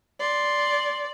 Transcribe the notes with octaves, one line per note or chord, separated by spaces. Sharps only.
D5 C6